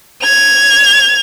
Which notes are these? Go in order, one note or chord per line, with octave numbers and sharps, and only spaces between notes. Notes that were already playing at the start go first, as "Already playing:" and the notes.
G#6 F7